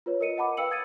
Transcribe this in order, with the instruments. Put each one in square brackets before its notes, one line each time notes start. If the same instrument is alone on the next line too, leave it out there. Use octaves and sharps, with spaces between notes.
[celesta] F4 B4 C#5
A#4 D#5 C#7 D#7
D#5 F#5 A5 B5 D6
B4 F5 G5 E6 C#7 F#7
D#6 G#6 A6 C#7 D#7